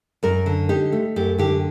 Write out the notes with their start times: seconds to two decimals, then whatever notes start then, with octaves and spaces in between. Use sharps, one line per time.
0.23 F#2 A#4
0.46 D3
0.69 D#4 G4
0.92 A3
1.16 F#2 G4
1.38 D3 G4